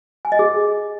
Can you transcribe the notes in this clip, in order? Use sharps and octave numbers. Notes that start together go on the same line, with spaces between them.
G#5
D#5
G#4